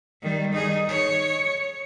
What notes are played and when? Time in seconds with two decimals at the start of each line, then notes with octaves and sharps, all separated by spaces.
0.22 D#3 G3
0.52 D#4 G#4
0.88 C#5